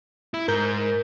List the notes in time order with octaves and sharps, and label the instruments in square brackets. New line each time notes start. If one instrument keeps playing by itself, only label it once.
[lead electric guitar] E4
[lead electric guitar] G#2 [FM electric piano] A#4 G6